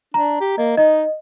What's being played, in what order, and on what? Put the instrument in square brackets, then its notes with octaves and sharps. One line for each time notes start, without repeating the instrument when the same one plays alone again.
[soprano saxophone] D4 [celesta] A#5
[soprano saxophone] G4
[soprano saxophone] A#3 [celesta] D#5
[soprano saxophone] D#4 [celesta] D#5